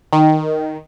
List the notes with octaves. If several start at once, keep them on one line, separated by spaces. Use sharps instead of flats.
D#3